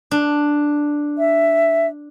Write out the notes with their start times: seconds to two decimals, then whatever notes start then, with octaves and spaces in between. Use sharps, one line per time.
0.11 D4
1.18 E5